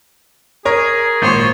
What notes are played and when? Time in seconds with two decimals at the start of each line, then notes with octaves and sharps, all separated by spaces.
0.65 G#4 A#4 C#5
1.22 G#1 A#2 C5 C#5